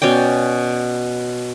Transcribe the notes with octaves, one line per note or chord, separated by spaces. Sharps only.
B2 C#4 D5 G5